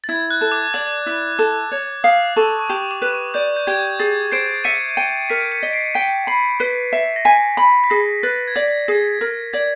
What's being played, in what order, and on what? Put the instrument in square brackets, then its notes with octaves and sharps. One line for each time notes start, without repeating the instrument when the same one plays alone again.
[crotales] A6
[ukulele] E4 [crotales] G#6
[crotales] F#6
[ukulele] A4
[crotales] D6
[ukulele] D5 [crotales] D6
[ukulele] E4
A4
C#5
[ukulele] F5 [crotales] D#6
[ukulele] A4 [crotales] C#6
[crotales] C#6
[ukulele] G4 [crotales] D6
[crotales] D6
[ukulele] B4
[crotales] C#6
[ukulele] D5 [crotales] G6
[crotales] G6
[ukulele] G4 [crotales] G#6
[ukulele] G#4 [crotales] A6
[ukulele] C5 [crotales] C7 D7
[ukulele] E5 [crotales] C#7 D#7
[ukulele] G5 [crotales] C#7 D#7
[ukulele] A#4 [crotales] B6 C#7
[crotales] C#7 D#7
[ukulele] D#5
[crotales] C7 D7
[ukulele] G5 [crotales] B6 C#7
[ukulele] B5 [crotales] C7
[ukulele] B4 [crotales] B6
[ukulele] E5
[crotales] A#6
[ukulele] G#5 [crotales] B6
[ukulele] B5
[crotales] B6
[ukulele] G#4 [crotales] A#6
[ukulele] B4 [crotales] A6
[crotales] G#6
[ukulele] D5 [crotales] A6
[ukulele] G#4 [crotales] A#6
[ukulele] A#4 [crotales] A#6
[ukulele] D5 [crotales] G#6